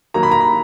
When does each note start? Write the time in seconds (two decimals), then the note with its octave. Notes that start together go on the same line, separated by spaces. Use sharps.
0.14 D#3 F#3 A#3 A#5
0.23 B5
0.31 A#5
0.41 B5